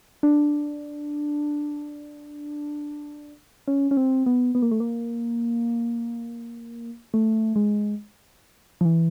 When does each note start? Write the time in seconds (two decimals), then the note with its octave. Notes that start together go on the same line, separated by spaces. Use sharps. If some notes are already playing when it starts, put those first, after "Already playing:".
0.23 D4
3.68 C#4
3.91 C#4
3.97 C4
4.26 B3
4.55 B3
4.62 A#3
4.71 A3
4.80 A#3
7.14 A3
7.56 G#3
8.81 F3
8.85 E3